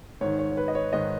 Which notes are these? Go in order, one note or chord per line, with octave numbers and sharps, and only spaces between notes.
G#2 D#3 C#5
C#5
C#5
B4
D#5
C#5
G#2 D#3 D#5